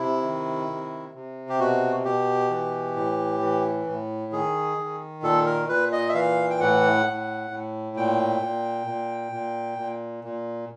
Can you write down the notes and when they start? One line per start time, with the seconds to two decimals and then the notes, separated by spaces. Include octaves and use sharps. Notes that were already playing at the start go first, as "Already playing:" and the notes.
Already playing: C3 E4
0.22 D#3
0.68 C3
1.14 C3
1.49 G4
1.59 B2 F#4
2.05 B2 G4
2.50 E3
2.96 A2
3.41 E3
3.87 A2
4.32 D#3 G#4
4.78 D#3
5.23 A#2 A4
5.46 A#4
5.69 A#2 B4
5.92 D#5
6.09 E5
6.14 E3 F5
6.50 G5
6.60 A2 F#5
7.06 A2
7.50 A2
7.96 A#2 G5
8.42 A#2
8.87 A#2
9.32 A#2
9.79 A#2
10.24 A#2